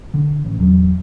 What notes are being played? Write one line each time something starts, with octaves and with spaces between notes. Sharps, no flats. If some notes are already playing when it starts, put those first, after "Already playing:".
D3
A1
E2 F#3